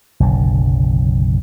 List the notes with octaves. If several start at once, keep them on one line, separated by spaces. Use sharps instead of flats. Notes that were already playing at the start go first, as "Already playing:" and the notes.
F#1 B1 D3